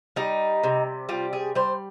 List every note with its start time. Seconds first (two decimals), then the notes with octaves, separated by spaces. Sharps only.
0.16 G3 D#4
0.64 C3
1.09 G3 F4
1.33 G#4
1.55 G3 C5